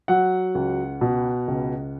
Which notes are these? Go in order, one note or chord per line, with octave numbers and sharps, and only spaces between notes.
F#3 F#5
C#2
B2
C#2